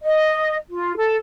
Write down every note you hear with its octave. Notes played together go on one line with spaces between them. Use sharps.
D#5
F4
A4